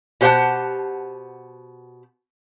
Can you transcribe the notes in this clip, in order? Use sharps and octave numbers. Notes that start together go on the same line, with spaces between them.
B2 G4 C5 F5 F#5 A5